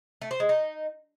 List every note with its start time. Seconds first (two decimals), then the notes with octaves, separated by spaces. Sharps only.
0.22 A3
0.31 C5
0.40 G#3
0.49 D#4